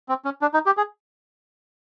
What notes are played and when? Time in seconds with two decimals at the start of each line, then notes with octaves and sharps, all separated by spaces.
0.09 C4
0.25 C#4
0.42 D4
0.54 D#4
0.66 G4
0.77 G#4